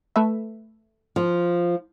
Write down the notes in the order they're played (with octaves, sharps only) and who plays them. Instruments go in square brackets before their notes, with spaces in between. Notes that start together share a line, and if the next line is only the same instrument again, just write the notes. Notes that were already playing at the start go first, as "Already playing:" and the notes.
[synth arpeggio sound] A3 B4 E5
[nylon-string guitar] F3